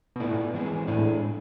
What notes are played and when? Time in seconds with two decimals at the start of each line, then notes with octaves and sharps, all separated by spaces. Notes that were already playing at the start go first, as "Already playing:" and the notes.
0.16 B2
0.20 A2 B3 F4 B4 D5
0.31 A2
0.54 E3 G#3 C4 G#4
0.87 A2 G#3 D4 G#4 D5